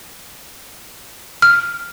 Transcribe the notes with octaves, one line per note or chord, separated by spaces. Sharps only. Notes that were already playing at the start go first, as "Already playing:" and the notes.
F6